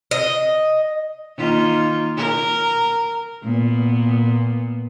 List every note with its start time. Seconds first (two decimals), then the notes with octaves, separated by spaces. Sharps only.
0.11 D#5
1.37 D#3 A#3 F4
2.17 A#4
3.43 A#2 B3